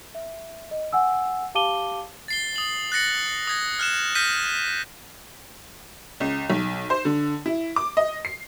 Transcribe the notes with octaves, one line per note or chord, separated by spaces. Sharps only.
E5
D#5
F#5 G#5 E6
G4 F5 A5 D6 D#7 G7
A6 C7 G7
D#6 F#7
F#6 A6 A#6 C#7 F#7
D#6 G#6 A#6
F6 F#6 E7
F6 G6 A#6 B6 D#7
C#2
B1
C5
D3
E4
D6
D#5
C7